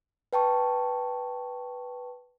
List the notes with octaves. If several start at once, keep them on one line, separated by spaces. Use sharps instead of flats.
B4 G5 A5 C#6